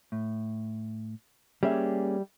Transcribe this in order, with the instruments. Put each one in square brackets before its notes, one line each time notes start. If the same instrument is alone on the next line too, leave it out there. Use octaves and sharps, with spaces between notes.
[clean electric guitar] A2
[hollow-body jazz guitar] G3 E5 [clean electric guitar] A#3 C#4 G#4